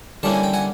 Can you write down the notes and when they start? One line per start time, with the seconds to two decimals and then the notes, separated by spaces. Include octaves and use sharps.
0.23 D3 G3 A#3 C#4 E4 A5
0.33 G#5
0.43 G5
0.54 F#5 G#5